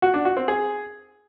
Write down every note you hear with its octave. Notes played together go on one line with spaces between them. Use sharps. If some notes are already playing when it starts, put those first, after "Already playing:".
F#4
D4
F#4
C4
G#4